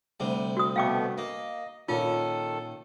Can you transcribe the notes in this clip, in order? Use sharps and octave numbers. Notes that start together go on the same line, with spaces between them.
D2 C3 G3
F#4 D#6
B2 A3 B3 F5 G5 D6
A#3 D#5
A#2 D#3 C#4 F4 A4